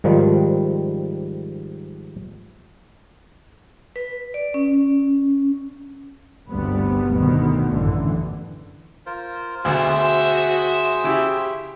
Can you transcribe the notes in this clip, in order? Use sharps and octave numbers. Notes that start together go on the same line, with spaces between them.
G#2 D#3 F3 G3
B4
D5
C#4
G1 D2 C3 G3 B3
D2 B2 D#3 B3
A1 F#2 A2 D3 E3
F4 A#4 C5
D2 B2 F#4 G#4 C5 E5 G5
C#3 E4 G4